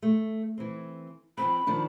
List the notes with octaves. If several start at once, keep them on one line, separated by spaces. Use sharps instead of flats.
A3
E3 C4
F3 C4 B5
D#3 F3 D4